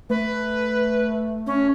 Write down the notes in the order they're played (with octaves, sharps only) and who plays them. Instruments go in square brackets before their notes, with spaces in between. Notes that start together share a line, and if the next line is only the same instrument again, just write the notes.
[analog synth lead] A3 [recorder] B4
[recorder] C#4